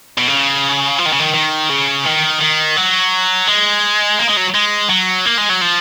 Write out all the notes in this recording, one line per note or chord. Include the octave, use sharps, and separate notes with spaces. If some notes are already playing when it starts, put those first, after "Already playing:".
B2
C#3
F3
D#3
C#3
D#3
D#3
C#3
D#3
D#3
F#3
G#3
A#3
G#3
F#3
G#3
F#3
A#3
G#3
F#3
F3